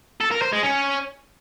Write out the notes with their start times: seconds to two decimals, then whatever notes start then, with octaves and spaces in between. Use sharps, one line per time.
0.20 A4
0.31 A#4
0.42 C5
0.53 G#3
0.63 C#4